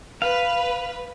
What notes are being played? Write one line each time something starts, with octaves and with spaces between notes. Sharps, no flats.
B4 F5